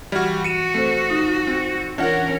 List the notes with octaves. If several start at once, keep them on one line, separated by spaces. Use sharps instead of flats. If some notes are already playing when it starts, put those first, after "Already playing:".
E3 G3 F#4 F6 G#6
F#4 C#7 D#7 E7
A3 C4 A4 C5
D#4
C4
E3 C#4 D4 F4 A#4 F#5 A#6